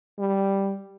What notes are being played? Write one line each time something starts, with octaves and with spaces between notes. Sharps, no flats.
G3